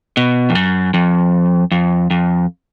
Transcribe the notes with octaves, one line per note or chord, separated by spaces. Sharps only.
B2
F2
F#2
F2
F2
F2